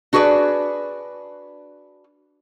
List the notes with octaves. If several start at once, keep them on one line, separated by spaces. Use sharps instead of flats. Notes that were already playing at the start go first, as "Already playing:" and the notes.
D4 F#4 G#4 B4 D5